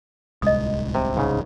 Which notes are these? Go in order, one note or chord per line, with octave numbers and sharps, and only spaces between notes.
D1 C2 G#3 D#5 D#6
C3
G#2 C#3